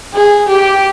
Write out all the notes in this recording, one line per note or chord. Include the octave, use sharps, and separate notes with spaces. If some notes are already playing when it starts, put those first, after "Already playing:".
G#4
G4